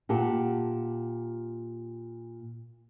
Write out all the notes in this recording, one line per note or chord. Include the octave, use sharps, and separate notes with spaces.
A#2 G4 F#5 A5